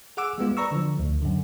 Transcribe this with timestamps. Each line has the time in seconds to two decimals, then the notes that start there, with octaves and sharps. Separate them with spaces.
0.17 G#4 F#5 D6 E6
0.38 G3 G#3 B3 F4
0.57 B4 D5 A#5 C#6 E6
0.72 D3 F3
0.99 D2
1.22 F#2 D3